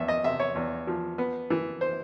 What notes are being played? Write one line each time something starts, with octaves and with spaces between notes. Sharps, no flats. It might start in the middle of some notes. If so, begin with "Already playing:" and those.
Already playing: E2 E5
D#5
C3 E5
C#5
E2
F3
B3
E3
C5